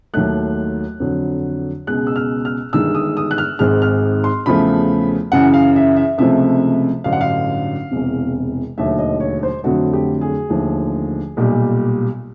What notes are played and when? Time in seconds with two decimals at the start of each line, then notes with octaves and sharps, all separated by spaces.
0.14 D#2 D#3 F#3 A3 F#6
1.00 F2 D3 F#3
1.87 C#2 B2 G#3 F#6
2.07 E6
2.16 F6
2.45 F6
2.73 G1 G2 D#3 G#3 E6
2.95 D#6
3.17 D#6
3.31 F#6
3.38 F6
3.59 G#1 G#2 D#3 G#3 F6
3.82 F6
4.24 C6
4.46 E2 C#3 F3 A3 B5
5.32 F#2 C#3 E3 F#5
5.54 F5
5.76 E5
5.96 E5
6.18 C#2 C3 F3 A3 E5
7.04 A1 G2 D3 F#3 F5
7.13 F#5
7.21 F5
7.91 E1 E2 C3
8.78 E1 D#2 D3 F#3 A3 E5
8.99 D#5
9.20 C#5
9.43 C5
9.64 F2 D3 F#3 A3 F#4
9.93 G4
10.21 G#4
10.50 D#2 D3 F3 A3
11.37 B1 A#2 G3